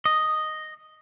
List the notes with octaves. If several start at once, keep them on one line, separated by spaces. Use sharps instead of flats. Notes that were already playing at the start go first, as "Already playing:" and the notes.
D#5